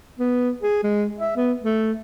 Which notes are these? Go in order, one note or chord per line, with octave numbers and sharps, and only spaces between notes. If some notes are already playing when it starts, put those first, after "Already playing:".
B3
G#4
G#3
E5
B3
A3